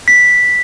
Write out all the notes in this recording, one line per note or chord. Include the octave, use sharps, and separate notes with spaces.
B6